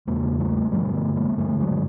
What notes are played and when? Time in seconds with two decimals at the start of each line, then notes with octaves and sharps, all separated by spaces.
0.07 E2 C#3 G#3 A#3
0.39 G3 A3
0.72 G2 D3 F3 G3
0.94 A3 B3
1.15 G#3 A#3
1.38 G2 D3 G3 A3
1.60 F#3 G#3